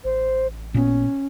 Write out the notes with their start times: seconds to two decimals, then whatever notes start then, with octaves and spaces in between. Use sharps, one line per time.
0.04 A1 C5
0.74 A#2 B3 C#4